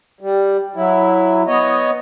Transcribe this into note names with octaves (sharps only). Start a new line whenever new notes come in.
G3
F#3 E4
B3 C#5 D#5